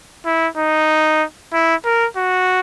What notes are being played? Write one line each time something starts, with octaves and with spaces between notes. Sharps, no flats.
E4
D#4
E4
A#4
F#4